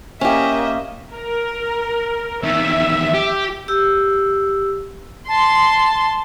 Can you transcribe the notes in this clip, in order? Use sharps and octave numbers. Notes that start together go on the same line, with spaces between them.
A#3 C#4 G4 D#5 E5
A#4
E2 D#3 E5
G4
G4 E6
A5 C6